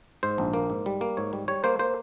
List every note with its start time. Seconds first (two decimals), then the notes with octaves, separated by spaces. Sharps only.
0.23 G#2 C5
0.38 A#1
0.53 A#3
0.70 G#2
0.86 G3
1.01 A#3
1.17 G#2 C#5
1.33 G3
1.48 G3 C#5
1.64 A#3 C5
1.79 A#3 C5